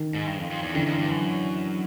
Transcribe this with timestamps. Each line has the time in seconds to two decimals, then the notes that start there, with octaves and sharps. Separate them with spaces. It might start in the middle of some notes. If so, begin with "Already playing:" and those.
Already playing: D#3
0.15 G#2
0.27 G2
0.39 F2
0.51 F2
0.62 E2
0.75 F2 D3 E3
0.87 F2
0.98 G2
1.10 F#2